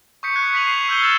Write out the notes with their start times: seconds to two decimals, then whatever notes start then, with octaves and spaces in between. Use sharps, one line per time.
0.23 C#6 D#6 G6 B6 C#7
0.36 F#6 G#6
0.53 C#6 G#6 B6 D#7 F7 F#7
0.67 C7
0.89 E6 F#6 G6 C#7 G7
1.01 E6 F6 G#6 A6 E7